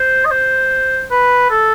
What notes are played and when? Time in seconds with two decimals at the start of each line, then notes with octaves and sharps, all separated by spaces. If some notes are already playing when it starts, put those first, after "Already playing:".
Already playing: C5
0.25 D#5
0.31 C5
1.11 B4
1.50 A4